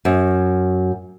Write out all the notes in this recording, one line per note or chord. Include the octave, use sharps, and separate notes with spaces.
F#2